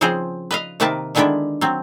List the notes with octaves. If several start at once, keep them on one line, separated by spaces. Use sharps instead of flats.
C#3 F3 C4 G#4 C5
B4 D#5 F5
C3 D#3 A#3 B4 E5 A5
D3 D#3 G#3 B3 D4 E4
F#3 C4